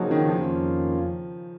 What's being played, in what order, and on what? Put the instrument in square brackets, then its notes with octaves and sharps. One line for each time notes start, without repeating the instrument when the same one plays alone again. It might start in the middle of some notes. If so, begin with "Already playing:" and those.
Already playing: [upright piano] C#3 F3 F#3 [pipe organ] A#3 D#4 F#4
[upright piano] D#3
[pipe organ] F2 D#3 A#3 C#4 F4 [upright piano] F3